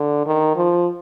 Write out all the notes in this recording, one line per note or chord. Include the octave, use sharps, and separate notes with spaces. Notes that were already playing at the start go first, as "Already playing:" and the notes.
Already playing: D3
D#3
F3